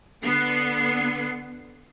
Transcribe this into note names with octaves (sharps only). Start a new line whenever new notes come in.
D3 B3 C7